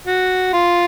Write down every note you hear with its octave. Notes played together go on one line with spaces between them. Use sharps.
F#4
F4